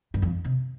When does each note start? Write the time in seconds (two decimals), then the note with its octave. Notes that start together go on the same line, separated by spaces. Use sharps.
0.14 G2
0.22 F2
0.45 C3